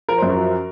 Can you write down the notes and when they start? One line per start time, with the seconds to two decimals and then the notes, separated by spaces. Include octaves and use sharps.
0.08 F3 A#4
0.18 F#2 C5
0.29 F#4 A#4
0.37 F3